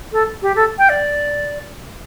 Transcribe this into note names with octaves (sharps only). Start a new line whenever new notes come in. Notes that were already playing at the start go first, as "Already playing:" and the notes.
A4
G4
A4
G5
D5